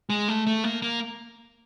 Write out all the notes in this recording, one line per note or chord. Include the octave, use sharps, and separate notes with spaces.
G#3
A3
A3
A#3
A#3